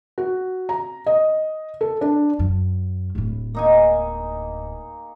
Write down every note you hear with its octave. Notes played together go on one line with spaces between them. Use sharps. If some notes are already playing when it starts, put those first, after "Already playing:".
F#4
A#5
D#5
A4
D4
F#2
D1 A2
A#3 D#4 G#5